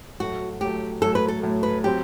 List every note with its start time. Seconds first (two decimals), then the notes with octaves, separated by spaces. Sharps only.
0.20 A2 F#3 A3 F#4
0.61 A2 F#3 A3 G4
1.02 A2 F#3 A3 A4
1.15 B4
1.28 A4
1.42 A2 F#3 A3
1.63 B4
1.84 F#3 C4 G4